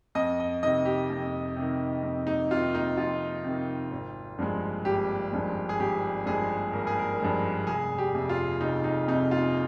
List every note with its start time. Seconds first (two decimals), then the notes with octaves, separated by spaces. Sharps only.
0.15 F2 D#5
0.40 D#5
0.63 C3 D#3 D#5
0.85 G4
1.10 F2
1.56 C3 D#3
2.03 F2
2.27 D#4
2.51 C3 D#3 F4
2.75 D#4
2.98 F2 F4
3.44 C3 D#3
3.91 G#1
4.39 G2 F3 G#3
4.85 G#1 G4
5.32 G2 F3 G#3
5.69 G#4
5.79 G#1 G4
6.26 G2 F3 G#3 G#4
6.73 G#1 A#4
6.87 G#4
6.99 A#4
7.20 G2 F3 G#3
7.67 F1 G#4
7.98 G4
8.15 F2 C3
8.29 F4
8.61 F1 D#4
8.84 D#4
9.08 F2 C3 D#4
9.31 F4